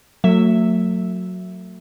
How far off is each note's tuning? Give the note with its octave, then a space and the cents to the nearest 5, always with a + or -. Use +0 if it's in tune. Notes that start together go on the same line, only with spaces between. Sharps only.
F#3 -15 A3 +40 E5 +0